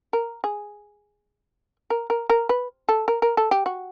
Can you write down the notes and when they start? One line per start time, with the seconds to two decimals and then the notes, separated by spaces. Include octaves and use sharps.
0.13 A#4
0.44 G#4
1.90 A#4
2.10 A#4
2.30 A#4
2.49 B4
2.89 A4
3.08 A#4
3.22 A#4
3.37 A4
3.51 G4
3.66 F#4